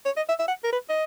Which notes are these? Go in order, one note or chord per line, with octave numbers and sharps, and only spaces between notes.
C#5
D#5
E5
E5
F#5
A#4
B4
D#5